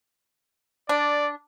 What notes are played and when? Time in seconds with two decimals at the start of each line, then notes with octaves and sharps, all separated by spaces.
0.89 D4 D5